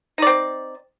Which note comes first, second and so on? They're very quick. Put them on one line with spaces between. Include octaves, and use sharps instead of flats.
D#4 D5 C4